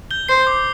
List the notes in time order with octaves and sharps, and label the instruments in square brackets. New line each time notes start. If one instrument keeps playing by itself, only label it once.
[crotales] G6 G7
[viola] C5 [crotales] C7
[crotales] D6